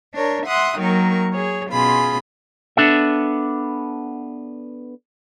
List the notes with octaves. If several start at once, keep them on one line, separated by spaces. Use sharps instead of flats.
D4 A#4 C#5
E5 F#5 C6 D#6 F#6
D#3 F#3 A#3 A#4 C#6
G#4 C#5
B2 C#4 F4 G#4 B5 C6
B3 D4 A4 E5